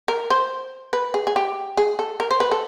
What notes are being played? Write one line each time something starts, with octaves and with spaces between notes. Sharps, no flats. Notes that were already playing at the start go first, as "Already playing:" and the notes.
A#4
C5
B4
G#4
G#4
G4
G#4
A4
A#4
C5
B4
A4